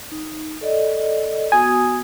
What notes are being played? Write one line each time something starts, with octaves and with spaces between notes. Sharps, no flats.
D#4
A4 D5 D#5
B3 F#4 G#5 D#6